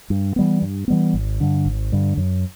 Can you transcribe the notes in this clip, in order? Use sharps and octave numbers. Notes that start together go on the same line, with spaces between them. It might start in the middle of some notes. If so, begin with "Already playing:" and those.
G2
E3 G3 B3
G2
E3 G3 B3
G#1
G2 D3
G#1
G2 D3
F#2